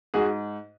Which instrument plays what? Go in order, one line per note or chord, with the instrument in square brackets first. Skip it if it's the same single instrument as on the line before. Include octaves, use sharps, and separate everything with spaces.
[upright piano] G#2 F#4 G#4